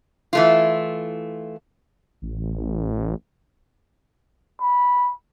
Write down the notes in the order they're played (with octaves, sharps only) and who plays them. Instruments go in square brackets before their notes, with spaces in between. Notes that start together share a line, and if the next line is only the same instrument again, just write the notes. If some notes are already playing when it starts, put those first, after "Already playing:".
[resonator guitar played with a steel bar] E3 A3 F4
[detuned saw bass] A1
[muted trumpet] B5